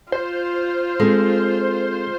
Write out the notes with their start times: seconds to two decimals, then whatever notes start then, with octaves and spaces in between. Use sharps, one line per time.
0.12 F4 C5
1.00 G#3 C4 A4